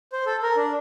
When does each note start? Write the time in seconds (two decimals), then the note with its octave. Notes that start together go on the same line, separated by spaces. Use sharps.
0.13 C5
0.26 A4
0.43 A#4
0.56 D4